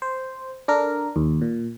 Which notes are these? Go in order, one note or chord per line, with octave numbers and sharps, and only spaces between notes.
C5
D4 A4 A#4
D#2
A#2